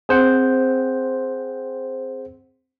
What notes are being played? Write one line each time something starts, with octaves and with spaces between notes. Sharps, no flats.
C4 G#4 C5 F#5